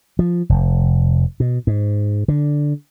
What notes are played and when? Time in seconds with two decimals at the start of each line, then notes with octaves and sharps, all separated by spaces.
0.19 F3
0.49 F1
1.40 B2
1.67 G#2
2.28 D3